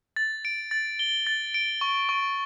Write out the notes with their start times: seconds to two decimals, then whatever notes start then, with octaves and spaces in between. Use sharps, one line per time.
0.16 A6
0.45 D7
0.71 A6
0.99 G7
1.27 A6
1.54 D7
1.81 C#6
2.09 C#6